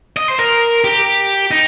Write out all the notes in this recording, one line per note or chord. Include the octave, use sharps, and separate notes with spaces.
D#5
C5
A#4
G4
D#4